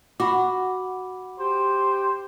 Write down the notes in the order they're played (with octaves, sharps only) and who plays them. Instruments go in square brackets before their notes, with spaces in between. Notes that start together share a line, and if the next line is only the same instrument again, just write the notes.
[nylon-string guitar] F#4 [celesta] F#5 B5 D6
[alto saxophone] G4 [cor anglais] C5